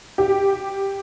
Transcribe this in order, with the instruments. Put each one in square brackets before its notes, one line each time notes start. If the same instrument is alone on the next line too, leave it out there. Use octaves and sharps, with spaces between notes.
[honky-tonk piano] G4